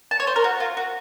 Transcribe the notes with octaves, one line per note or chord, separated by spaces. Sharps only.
A5
C#5
C5
A#4
F#4
F4
F#4